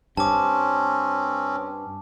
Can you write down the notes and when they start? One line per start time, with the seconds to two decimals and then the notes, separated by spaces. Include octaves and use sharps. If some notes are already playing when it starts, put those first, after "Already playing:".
0.17 G2 C4 C#4 A5 D6